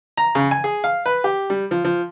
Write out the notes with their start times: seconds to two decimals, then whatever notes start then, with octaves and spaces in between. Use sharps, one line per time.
0.17 A#5
0.35 C#3
0.51 G#5
0.64 G#4
0.84 F5
1.06 B4
1.24 G4
1.50 G3
1.71 F3
1.84 F3